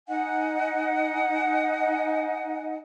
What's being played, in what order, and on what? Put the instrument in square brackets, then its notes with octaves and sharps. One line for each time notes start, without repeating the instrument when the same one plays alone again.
[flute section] D#4 D#5 F#5 G#5